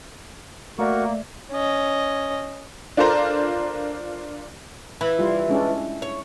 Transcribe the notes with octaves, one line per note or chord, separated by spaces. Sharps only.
A3 A#3 F#4 A#4 D5 E5 C#6
C#4 D#5
D4 F4 A4 A#4 C5 A#5
E3 B5
G3 E4 F4
G#3 C#4 D4
C#5